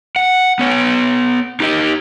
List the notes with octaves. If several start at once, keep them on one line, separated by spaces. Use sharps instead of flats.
F#5
B3 C#5
D#4 G4 A#4 D#5